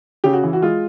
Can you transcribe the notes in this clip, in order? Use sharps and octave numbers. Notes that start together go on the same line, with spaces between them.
C#3 G4
F#4
E3
F#4
G#3 F4